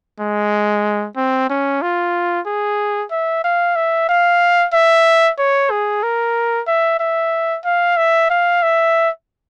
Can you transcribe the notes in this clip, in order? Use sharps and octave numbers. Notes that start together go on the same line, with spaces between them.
G#3
C4
C#4
F4
G#4
E5
F5
E5
F5
E5
C#5
G#4
A#4
E5
E5
F5
E5
F5
E5